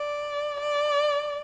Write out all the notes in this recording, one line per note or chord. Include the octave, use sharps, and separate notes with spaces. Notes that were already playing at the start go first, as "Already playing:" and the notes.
Already playing: D5
D5